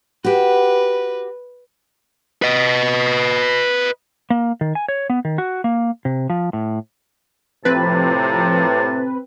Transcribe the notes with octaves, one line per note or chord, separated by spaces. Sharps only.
F#4 G4 B4
B4 D#5
A#3
D#3
G#5
C#5
B3
D#3
F#4
A#3
C3
F3
A2
A2 C3 F3 C4 B4 A5